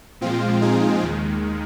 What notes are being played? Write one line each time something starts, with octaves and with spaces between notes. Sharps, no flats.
A#2 F3 G#3 C4 F4
D#4 G#4
D#2 D#3 G#3